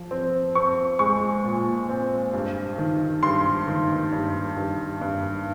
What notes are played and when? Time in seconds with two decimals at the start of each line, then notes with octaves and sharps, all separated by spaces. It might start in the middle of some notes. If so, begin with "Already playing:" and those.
Already playing: F3
0.11 C4
0.55 C4 C#6
0.99 G#3 C#6
1.45 A#2
1.89 C4
2.33 G2
2.78 D#3
3.23 G2 C6
3.68 D#3
4.12 G2
4.57 G2
5.01 G2